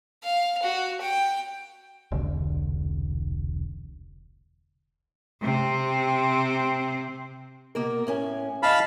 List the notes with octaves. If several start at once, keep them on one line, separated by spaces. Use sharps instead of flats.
F5
F#4
G5
E1 C2 D3
C3 C4
B2 A#3 A#4
A2 C#4 G#5
E4 D#5 F5 A5 B5